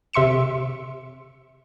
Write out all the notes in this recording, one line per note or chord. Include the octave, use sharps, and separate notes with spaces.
C3 E5 C6 C#7 E7